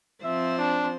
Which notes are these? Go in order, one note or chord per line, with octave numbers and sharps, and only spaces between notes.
F3 C4 C5 E5
D4